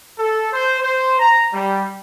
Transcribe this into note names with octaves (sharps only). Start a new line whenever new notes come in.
A4
C5
C5
A#5
G3